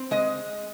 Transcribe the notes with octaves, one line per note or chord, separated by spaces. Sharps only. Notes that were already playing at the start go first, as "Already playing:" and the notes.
Already playing: C4
G#3 D#5